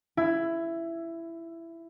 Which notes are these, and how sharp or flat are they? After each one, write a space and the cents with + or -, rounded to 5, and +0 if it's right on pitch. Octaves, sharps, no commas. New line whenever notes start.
E4 +15